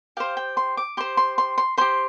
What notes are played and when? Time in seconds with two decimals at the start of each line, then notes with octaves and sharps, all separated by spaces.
0.17 G4 C5 F5
0.37 G5
0.57 C6
0.77 D6
0.97 G4 C5 C6
1.17 C6
1.38 C6
1.58 C6
1.78 G4 C5 C6